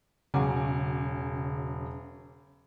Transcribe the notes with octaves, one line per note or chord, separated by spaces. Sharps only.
E1 C#3 F#3 G#5 D6